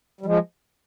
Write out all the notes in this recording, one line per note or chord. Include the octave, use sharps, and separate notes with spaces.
G3
F3 G#3